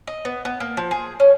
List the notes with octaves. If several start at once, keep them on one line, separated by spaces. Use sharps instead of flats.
D#5
B3
B3
A#3
F3
G#4
C#4